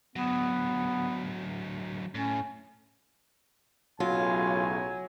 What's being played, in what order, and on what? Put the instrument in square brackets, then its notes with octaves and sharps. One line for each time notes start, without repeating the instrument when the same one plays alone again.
[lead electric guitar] D2 F#3 [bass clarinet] B3
[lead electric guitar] A2 [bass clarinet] C#4
[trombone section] B1 A2 C#3 [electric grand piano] F#3 [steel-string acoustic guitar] F4 [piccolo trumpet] G#5